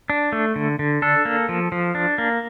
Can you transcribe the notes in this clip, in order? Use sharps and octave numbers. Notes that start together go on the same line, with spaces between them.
D4
A3
D3
D3
D4 A4
A#3
F3
F3
D4
A#3